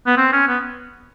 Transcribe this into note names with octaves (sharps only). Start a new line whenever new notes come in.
B3
C4
C#4
B3